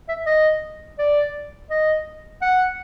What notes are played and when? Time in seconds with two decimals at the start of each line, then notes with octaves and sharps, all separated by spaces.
0.09 E5
0.26 D#5
0.99 D5
1.70 D#5
2.42 F#5